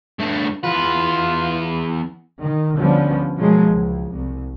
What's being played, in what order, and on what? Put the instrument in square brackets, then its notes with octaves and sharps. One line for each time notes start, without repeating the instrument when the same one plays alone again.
[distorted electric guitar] G2 A3
[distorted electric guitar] E2 B4 [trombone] F4
[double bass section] D#3
D2 D3 F3 G3 B3 C#4
B2 F3 F#3 G#3 A#3
C#2
C2